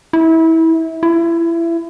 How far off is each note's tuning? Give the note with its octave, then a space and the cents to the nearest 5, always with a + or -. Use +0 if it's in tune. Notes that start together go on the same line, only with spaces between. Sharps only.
E4 -25
E4 +25